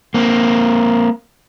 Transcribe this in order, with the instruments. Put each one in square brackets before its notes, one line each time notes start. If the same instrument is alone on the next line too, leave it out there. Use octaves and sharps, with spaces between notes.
[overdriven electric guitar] A#3 C4